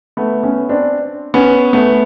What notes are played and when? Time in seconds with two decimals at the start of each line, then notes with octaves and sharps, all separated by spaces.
0.17 A3 B3
0.43 B3 C#4
0.69 C4 D4
1.34 B3 C#4
1.73 A3 B3